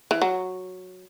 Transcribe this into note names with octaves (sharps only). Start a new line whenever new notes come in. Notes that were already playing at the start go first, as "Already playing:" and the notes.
E3
F#3